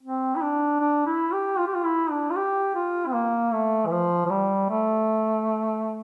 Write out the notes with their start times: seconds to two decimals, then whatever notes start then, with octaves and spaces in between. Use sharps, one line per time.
0.03 C4
0.36 E4
0.42 D4
0.80 D4
1.06 E4
1.32 G4
1.58 F4
1.67 G4
1.74 F4
1.85 E4
2.11 D4
2.30 F4
2.36 G4
2.75 F4
3.07 C4
3.14 A#3
3.52 A3
3.86 E3
3.91 F3
4.26 F3
4.30 G3
4.69 A3